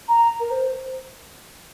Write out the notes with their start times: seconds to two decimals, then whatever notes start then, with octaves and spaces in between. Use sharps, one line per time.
0.08 A#5
0.40 A#4
0.50 C5